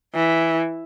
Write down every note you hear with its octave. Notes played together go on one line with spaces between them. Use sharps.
E3